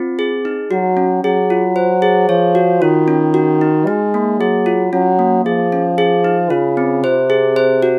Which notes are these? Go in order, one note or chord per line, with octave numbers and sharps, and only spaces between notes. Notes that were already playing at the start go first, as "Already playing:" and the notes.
Already playing: C4 F4
G#4
D#4
F#3 F#4
C#4
F#3 G#4
F4
C5
G#4
F3 C#5
F#4
D#3 F4
C#4
F#4
D#4
G#3 D#4
A#3
F#3 G#4
F4
F#3 C#4
A#3
F3 G#4
C#4
G#4
D#4
C#3 F4
C4
C3 C5
G#4
C5
F#4